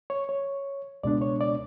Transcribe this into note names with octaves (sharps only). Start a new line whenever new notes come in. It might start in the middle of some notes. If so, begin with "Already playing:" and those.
C#5
C#5
C#2 B2 G#3 B3 D4 D5
C#5
D5